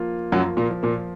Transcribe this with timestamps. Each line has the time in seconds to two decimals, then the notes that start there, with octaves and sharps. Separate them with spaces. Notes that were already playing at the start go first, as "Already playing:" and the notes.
Already playing: F3 A#3 F4
0.32 F#2 F3 F#3
0.57 A#2 A#3
0.70 F3
0.83 A#2 A#3